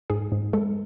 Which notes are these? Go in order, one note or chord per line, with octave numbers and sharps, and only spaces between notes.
G#2 G#4
G#2
G#3 A4